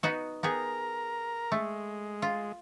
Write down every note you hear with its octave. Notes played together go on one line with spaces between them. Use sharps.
B3 D#4 F#4
B3 G4 G#4 A#4 A#5
G#3 A3
F4